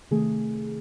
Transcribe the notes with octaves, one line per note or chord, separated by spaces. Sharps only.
C3 D#3 A3 G#4